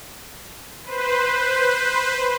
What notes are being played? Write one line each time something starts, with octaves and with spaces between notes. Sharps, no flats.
B4 C5